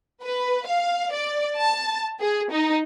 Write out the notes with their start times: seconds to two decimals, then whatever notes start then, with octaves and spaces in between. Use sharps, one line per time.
0.24 B4
0.67 F5
1.12 D5
1.57 A5
2.20 G#4
2.51 D#4